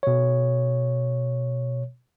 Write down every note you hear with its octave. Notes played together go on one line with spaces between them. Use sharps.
B2 C#5